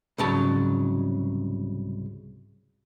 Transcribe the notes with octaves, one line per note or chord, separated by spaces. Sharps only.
C2 G#2 C#3 F#3 A5